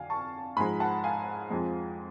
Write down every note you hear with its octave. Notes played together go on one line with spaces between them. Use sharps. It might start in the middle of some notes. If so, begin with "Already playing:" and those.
Already playing: F2 D3 F#3 D5 F5 G#5
A5 C#6
G#2 F3 G#3 G#5 B5
F#5 A5
F5 G#5
F2 F3 G#3